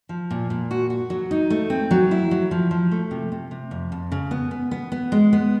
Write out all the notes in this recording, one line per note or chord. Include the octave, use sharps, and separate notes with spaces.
F3
A#2
A#2
F#4
F#4
F#3
D#4
A3
C4
F#3
E4
F#3
F3
F3
A3
C3
C3
C3
F2
F2
C#3
B3
B3
B3
B3
G#3
B3